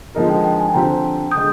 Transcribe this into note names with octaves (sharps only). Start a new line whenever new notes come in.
D3 F3 G#3 D#4 A#4
G5
G5
G#5
D3 F3 C4 G4 G5 A#5
D#6 G6
D3 G#3